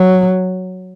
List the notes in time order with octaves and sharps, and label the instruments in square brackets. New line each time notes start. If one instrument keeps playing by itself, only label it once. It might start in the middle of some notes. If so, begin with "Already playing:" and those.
Already playing: [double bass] F#3